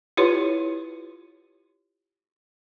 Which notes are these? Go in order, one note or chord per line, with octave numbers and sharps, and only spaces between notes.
E4 F4 G4 B4 C#5